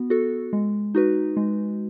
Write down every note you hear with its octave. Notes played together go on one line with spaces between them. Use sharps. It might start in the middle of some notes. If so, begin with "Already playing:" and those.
Already playing: B3 F#4
F#4 A4
G#3
D#4 F#4 B4
G#3